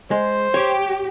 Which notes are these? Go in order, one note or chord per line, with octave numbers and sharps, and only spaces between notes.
G#3 C5
G4 C#5